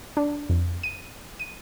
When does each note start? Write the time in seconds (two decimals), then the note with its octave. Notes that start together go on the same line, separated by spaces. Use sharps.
0.17 D4
0.49 F2
0.83 D#7
1.39 D#7